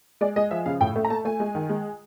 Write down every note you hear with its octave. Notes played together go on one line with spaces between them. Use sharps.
G#3 D5
G#3 D#5
F3 E5
C#3 F5
A2 G5
A3
A#5
A3 A5
A3 G#5
G#3
D#3
G#3